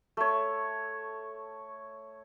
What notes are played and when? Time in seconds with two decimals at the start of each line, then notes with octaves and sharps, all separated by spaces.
0.17 A3 C#5